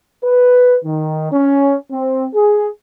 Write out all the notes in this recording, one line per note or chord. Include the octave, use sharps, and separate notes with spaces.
B4
D#3
C#4
C4
G#4